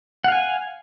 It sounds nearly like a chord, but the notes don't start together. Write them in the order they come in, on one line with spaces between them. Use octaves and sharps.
F#5 F5 G#5